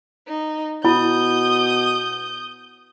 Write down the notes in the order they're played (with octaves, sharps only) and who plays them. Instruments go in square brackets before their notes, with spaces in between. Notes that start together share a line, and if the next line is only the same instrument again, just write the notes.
[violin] D#4
[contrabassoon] B2 [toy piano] E4 B5 [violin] D#6 G6